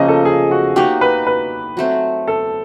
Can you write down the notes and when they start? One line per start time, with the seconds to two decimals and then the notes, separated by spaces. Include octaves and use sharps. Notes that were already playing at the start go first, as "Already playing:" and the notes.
Already playing: C#3 F3 A#3 C#4 D#5
0.08 A4
0.25 G#4
0.51 F#4
0.76 A#3 D#4 F#4 G4
1.01 B4
1.27 B4
1.77 F#3 A3 C4
2.28 A4